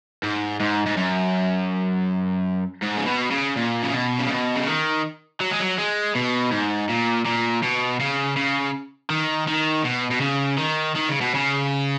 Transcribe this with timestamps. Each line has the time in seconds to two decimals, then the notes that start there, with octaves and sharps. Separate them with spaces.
0.23 G#2
0.60 G#2
0.86 G#2
0.97 F#2
2.83 G#2
2.98 C#3
3.06 B2
3.31 C#3
3.56 A#2
3.83 C#3
3.93 B2
4.19 C#3
4.30 B2
4.55 C#3
4.67 D#3
5.40 F#3
5.51 G#3
5.60 F#3
5.78 G#3
6.15 B2
6.51 G#2
6.89 A#2
7.25 A#2
7.63 B2
8.00 C#3
8.37 C#3
9.10 D#3
9.48 D#3
9.85 B2
10.11 B2
10.21 C#3
10.58 D#3
10.96 D#3
11.09 C#3
11.21 B2
11.35 C#3